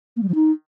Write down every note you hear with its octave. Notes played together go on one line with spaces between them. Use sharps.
A#3
G3
F3
D#4